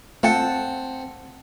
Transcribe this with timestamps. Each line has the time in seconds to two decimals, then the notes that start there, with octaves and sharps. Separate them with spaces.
0.23 A3 C4 F4 F#5 G5 A5 C#7